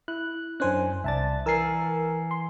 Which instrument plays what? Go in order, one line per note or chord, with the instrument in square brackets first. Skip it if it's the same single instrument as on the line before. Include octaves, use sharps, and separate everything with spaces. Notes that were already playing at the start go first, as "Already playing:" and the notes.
[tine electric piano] E4 [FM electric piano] F#6
[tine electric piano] F#2 G#5 F#6 [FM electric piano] C#4 D4 C5
[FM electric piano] C2 A5 A6 [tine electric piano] D5 E5
[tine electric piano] E3 G#5 C7 [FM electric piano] A#4 E6
[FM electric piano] C6